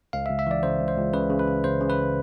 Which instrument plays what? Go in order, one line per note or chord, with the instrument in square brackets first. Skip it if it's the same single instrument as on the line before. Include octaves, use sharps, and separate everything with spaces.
[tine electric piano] C#2 F5
E5
C#2
E5
E3 D5
C#3 C5
C#2
C5
C#2
C#3 B4
C#3
B4
C#3
C#2 C5
C#3
B4